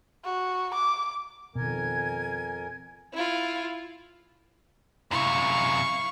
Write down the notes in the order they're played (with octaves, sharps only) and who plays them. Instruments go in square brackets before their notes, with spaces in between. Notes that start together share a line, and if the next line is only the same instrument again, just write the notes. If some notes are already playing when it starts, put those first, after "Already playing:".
[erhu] F#4
D6
[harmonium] F2 A#4 [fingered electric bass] B2 D#3 [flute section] G#5 G#6
[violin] E4 F4
[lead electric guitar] F#2 C3 [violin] E4 F5 [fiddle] C#6